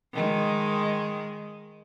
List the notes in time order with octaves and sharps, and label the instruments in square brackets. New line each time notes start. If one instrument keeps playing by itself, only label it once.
[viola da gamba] D#3 G#3